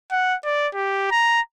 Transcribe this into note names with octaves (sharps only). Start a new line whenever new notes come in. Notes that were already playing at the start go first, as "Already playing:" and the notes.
F#5
D5
G4
A#5